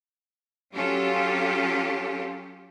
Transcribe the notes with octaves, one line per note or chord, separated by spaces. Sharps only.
F#3 C#4 F4 G4 A4